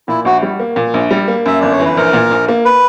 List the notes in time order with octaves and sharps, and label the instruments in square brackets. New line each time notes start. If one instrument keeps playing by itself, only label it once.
[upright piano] A#2 [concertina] E4
[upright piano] A#1 [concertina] F#4
[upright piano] G3
A#3
A#2
A#1
G3
A#3
[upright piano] F#2 [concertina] E5
[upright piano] G1 [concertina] D5
[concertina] C#5
[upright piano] E3
[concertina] B4
[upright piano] A#1 [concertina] A#4
[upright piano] A#2
A#1
A#3
[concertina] B4